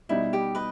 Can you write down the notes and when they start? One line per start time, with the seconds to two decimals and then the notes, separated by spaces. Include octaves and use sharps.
0.09 B2 G3 D#4 E4
0.33 G4
0.55 B4 D#5